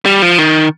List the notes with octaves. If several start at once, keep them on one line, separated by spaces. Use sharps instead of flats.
G3
F3
D#3